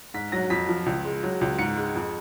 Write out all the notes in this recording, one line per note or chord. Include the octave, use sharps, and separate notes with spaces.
G#2 B6
F#3 A#6
F2 B6
F3
C#2
G#3
F#3
C#2
G#2 C#7
G#3
F2